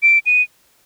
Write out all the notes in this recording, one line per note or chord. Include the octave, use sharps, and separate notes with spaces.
D7
D#7